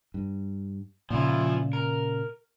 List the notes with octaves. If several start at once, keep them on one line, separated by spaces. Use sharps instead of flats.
G2
A#2 C#3 F3 E4
A#4